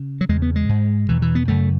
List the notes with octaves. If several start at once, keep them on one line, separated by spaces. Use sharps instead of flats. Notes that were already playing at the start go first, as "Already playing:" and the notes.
Already playing: C#3
F#3
E2 C#3 G#3
B3
G#3
G#2
E2 B2 E3
E3
B3
F#2 C#3 A3